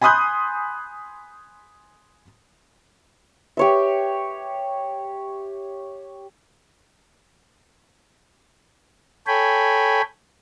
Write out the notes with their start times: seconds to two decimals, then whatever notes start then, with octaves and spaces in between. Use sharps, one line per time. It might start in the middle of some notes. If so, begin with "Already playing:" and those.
0.01 G#5 B5 C6 D#6 F#6 G6
3.57 G4 C#5 E5
9.27 A4 C#5 G5 G#5 B5